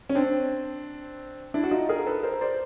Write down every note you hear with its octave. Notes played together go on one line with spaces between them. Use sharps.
C#4
C4 D4
D4 E4
F#4
D#4 F4
G#4 A#4
A4 B4
A#4 C5
C5 D5